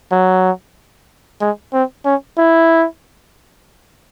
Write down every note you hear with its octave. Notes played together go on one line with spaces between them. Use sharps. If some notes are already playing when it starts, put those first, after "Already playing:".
F#3
G#3
C4
C#4
E4